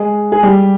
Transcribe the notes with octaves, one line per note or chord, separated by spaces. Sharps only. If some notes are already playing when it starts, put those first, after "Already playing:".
Already playing: G#3 G#4
G#4
G3 G4